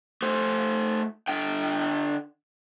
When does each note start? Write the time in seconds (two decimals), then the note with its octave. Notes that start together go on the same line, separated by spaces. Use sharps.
0.22 A3 C5
1.28 D3 G5